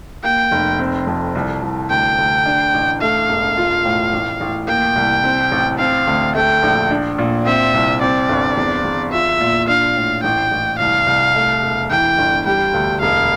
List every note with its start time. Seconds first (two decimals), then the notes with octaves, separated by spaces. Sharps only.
0.24 A#3 G5
0.51 F1
0.79 C4
1.07 F2
1.35 C2
1.62 C2
1.90 D2 G5
2.18 D2
2.46 D4
2.74 A1
3.01 A3 F5
3.29 E1
3.57 F4
3.85 A2
4.13 A1
4.41 A1
4.68 A#3 G5
4.96 C2
5.24 C4
5.51 A1
5.79 C4 F5
6.07 D2
6.35 A3 G5
6.63 A#1
6.90 D4
7.18 A#2
7.46 C4 E5
7.74 C2
8.01 C4 D5
8.29 G1
8.57 E2
8.84 E2
9.12 F4 E5
9.41 A#2
9.68 D4 F5
9.96 A2
10.24 A1 G5
10.51 A1
10.79 C2 F5
11.07 C2
11.35 A3
11.63 E1
11.91 E3 G5
12.18 G1
12.46 G3 G5
12.74 D2
13.01 E1 F5